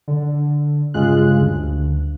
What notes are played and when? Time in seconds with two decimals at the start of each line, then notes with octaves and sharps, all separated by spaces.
0.08 D3
0.94 G2 C#3 G#3 F4 F#6
1.41 D2